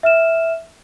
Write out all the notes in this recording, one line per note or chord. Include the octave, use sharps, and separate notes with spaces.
E5 F6 E7